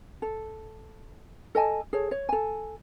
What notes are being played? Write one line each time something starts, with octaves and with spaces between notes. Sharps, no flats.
A4
A4 D#5 G#5 A5
G#4 A4 C#5
C#5
A4 G#5